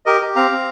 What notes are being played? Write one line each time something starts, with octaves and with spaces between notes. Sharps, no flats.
G4 A#4 D#5
G4
C4 F5 A#5
C4